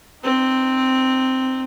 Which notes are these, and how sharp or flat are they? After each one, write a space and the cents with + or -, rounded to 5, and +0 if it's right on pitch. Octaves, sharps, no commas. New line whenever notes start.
C4 +0 D#4 -30